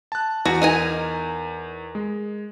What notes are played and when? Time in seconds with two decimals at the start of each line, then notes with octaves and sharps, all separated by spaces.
0.12 A5 F#6
0.45 E2 F#4
0.62 D#4 A#4 G#5
1.95 G#3